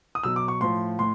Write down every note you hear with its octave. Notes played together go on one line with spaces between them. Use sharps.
D#6
B2 F#3 E6
D6
C#6
A2 F3 C6
A2 C6